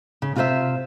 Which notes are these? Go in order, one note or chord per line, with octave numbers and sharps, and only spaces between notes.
C#3
C3 F4 F#4 B4 C5 E5